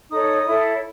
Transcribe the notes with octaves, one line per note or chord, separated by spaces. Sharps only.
D#4 A4 C#5 D#6
E4 A4 C#5